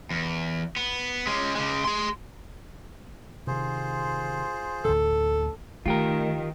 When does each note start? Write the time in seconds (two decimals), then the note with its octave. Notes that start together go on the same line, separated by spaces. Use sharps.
0.10 E2
0.77 B3
1.27 G#3 C#4
1.55 C#3 G#3
1.85 G#4 C6
3.47 C3 D#3 F4 G#4 C5
4.85 D2 A2 D3 A4
5.86 D#3 A3 F4 G4 A#4